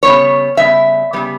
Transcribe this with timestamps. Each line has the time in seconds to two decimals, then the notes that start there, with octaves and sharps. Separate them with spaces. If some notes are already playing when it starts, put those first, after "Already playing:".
0.03 C#3 G3 B3 C#5
0.57 C#3 G3 B3 E5
1.13 C#3 G3 B3